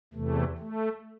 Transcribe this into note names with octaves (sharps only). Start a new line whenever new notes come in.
E2 C3 E3 A3
A3